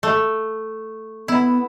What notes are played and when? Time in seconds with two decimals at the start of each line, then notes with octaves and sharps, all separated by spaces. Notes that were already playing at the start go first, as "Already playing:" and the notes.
0.03 A3
1.28 B3 E4